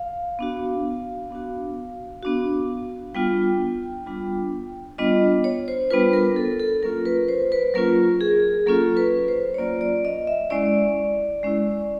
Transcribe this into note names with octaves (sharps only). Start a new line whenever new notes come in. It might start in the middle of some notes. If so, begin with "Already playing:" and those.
Already playing: F5
B3 D4 F#4
B3 D4 F#4
B3 D4 F#4
G3 B3 D4 F4 G5
G3 B3 D4 F4
G3 B3 D4 F4 D#5
C#5
C5
G3 B3 D4 F4 B4
A#4
A4
A4
F#3 A#3 C#4 F4 A#4
B4
C5
B4
F#3 A#3 C#4 F4 A#4
G#4
F#3 A#3 C#4 F4 A4
B4
C5
C#5
F#3 A#3 C#4 F4 D5
D5
D#5
E5
G#3 C#4 E4 D5
G#3 C#4 E4